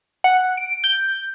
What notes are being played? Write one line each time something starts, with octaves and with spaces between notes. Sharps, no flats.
F#5
D7
G6